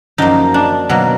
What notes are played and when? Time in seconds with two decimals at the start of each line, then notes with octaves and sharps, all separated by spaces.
0.18 F#2 F3 A#3 D#4
0.54 D4
0.89 B2 F#3 A#3